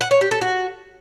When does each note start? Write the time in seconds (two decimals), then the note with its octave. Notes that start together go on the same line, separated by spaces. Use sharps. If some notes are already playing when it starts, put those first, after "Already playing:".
0.01 F#5
0.11 C#5
0.21 G4
0.31 A4
0.41 F#4